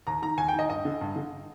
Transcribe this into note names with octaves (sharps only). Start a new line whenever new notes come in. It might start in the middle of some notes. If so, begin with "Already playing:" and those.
D#2 A#5
D#3 A#5
D#2 G#5
G5
D#3
D#5
G2 D#5
D3
G2
D3